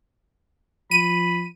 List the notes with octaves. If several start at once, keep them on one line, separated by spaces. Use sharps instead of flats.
F3 B5 D#7